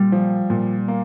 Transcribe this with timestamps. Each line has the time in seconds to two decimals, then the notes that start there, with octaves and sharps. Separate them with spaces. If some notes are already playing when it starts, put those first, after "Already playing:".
Already playing: A#2 G3
0.12 F3
0.50 A#2
0.88 A#3